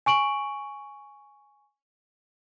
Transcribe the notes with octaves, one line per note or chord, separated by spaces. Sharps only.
G#5 C#6 D7 F#7